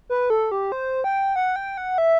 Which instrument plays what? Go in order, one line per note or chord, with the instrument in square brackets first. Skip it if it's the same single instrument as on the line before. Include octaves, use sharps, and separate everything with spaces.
[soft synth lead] B4
A4
G4
C5
G5
F#5
G5
F#5
E5